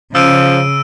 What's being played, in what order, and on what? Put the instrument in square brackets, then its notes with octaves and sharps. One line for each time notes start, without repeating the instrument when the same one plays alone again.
[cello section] C#3 [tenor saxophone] F3 [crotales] E6 D7 D#7